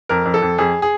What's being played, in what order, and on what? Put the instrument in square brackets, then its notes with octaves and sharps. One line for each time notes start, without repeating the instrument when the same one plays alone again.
[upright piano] F2 A#4
F2
A4
F2
F2 G#4
G#4